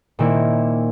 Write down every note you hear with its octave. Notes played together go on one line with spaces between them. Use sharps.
A#2 D#3 A#3 C4 E4 C#7